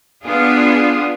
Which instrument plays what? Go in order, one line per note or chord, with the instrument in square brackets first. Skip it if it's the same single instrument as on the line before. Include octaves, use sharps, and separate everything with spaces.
[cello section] B3 D4 F4 G#4